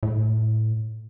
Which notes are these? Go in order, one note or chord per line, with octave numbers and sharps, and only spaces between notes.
A2